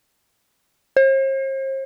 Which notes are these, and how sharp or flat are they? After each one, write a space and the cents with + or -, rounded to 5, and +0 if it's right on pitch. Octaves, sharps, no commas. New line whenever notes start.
C5 +45